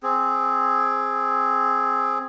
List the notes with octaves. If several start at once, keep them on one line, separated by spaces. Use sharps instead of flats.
C4 G#4